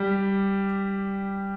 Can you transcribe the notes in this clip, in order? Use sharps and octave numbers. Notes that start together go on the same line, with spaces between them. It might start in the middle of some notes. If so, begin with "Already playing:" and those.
Already playing: G3 G4